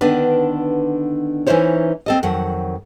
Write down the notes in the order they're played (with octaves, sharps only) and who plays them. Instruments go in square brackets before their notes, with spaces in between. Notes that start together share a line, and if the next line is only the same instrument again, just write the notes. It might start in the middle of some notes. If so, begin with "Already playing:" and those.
[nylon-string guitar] D3 D#3 B3 D4 B4
E3 C#4 D#4 E4 C5 C#5
C4 A4 D#5
F2 D#3 F#3 F#5